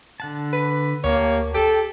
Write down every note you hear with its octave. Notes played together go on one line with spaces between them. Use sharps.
D3 F#5 A5
B4
D2 A#3 G4 C#5
G4 A4 G5